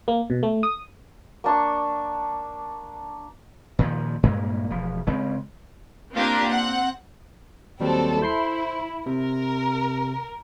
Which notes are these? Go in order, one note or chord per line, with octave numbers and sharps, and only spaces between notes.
A#3
B2
A3
D#6
A#3 D4 C#6
A#2 D#3 F3
G2 A#2 G#3 A#3
E1 F3
C#3 G#3 C4
A#3 C4 D4 F4 G4 A#4
C4 F#5
D#2 F#3 G3 C4 A4
E4 C5 C6 C7
C3 A#4